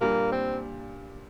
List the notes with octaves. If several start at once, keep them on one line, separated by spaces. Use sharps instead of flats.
A#2 G3 A#3 D4
C4